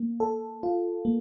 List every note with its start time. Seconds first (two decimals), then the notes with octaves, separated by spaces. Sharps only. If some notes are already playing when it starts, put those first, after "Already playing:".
Already playing: A#3
0.20 A4
0.63 F4
1.05 A#3